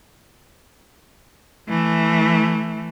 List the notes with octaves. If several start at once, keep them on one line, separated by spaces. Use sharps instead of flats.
E3 A3